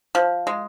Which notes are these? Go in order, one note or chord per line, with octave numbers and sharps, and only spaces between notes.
F3
G#3